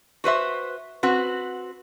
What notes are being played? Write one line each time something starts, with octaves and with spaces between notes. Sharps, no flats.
F#4 B4 C5 E5
C4 F#4 B4